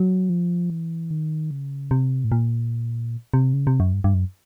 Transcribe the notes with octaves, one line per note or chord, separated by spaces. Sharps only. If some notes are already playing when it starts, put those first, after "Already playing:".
Already playing: F#3
F3
E3
D#3
C#3
C3
A2
A#2
C3
C#3
C3
F#2
G2
G2
F#2